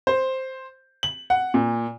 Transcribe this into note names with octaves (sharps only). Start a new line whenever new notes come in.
C5
F#7
F#5
A#2